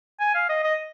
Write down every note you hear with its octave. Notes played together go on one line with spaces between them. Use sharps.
G#5
F5
D#5
D#5